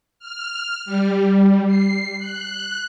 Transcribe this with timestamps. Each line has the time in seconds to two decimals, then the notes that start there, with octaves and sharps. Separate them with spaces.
0.19 F6
0.86 G3
1.66 C7
2.18 F#6